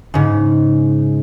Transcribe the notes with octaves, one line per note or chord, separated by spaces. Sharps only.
G#2 C#3